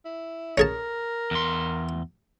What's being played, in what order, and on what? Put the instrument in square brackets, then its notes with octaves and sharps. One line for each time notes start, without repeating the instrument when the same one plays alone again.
[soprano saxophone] E4
[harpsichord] C#4 G#4 A5 [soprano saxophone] A#4
[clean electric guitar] E2 C6